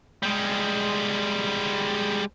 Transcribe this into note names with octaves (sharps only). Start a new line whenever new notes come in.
G3 G#3